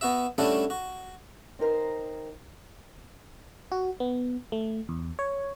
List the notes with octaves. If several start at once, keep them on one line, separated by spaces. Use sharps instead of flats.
B3 F#4 E5
G3 A3 C#4 D4 E4 F#4
F#4
C4 D#4 A#4 C5
F#4
B3
A3
E2
C#5